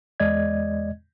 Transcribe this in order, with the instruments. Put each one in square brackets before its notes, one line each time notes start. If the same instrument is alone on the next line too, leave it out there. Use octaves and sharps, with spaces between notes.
[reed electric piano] E2 G#3 D5 D#5 G#6